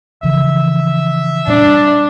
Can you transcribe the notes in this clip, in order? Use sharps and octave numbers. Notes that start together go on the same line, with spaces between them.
C#3 E3 F3 E5
A#2 G3 C4 D4